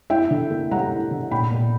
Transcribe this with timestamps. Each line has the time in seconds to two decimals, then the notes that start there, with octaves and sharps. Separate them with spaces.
0.10 E4 E5 G5
0.31 D3
0.51 A#3
0.71 G3 F#5 A#5
0.92 E4
1.11 D3
1.31 A#2 G5 B5
1.51 A#2